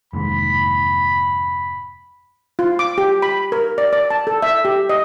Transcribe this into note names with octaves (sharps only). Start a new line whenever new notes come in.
F1 D#2 G#2 B5
F4
D6
G4
B5
A#4
D5
D5
A5
A4
E5
G4
D#5